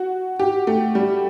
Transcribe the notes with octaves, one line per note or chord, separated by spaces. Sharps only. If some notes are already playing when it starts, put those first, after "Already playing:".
Already playing: F#4
G4
A3
G3